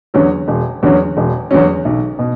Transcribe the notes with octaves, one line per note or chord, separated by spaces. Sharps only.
E2 D3 F#3 C#4
E1
E2 D3 F#3 C#4
E1
E2 D3 F#3 C#4
B1
B2